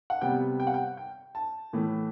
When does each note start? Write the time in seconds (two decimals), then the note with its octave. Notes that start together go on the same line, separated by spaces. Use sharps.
0.10 F#5
0.21 C3 G3 B3 G5
0.60 G5
0.67 F#5
0.74 G5
0.97 G5
1.35 A5
1.73 A2 E3 A3